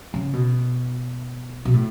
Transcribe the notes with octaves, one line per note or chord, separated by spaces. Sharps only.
C#3
B2
B2
A2